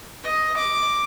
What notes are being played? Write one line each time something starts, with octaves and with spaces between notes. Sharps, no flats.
D#5
D6